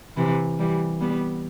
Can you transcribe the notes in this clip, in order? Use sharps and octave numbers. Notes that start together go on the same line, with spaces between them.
C3 E3
E3 G3
G3 B3